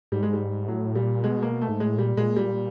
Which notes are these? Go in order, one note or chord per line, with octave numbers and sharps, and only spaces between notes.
G#2 G3
G#3
G3
A2 F#3
A#2 G3
B2 G#3
A#3
A3
G#2
A2 G#3
A#2 G3
A#2 G#3
G3